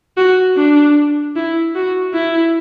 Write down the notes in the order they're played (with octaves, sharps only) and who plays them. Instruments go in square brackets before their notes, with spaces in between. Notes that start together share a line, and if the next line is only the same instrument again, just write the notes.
[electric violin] F#4
D4
E4
F#4
E4